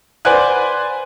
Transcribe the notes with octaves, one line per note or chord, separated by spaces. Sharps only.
B4 C5 D5 F#5 G#5 F#6